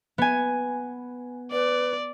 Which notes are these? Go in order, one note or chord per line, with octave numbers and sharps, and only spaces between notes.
B3 G#5
B4 D5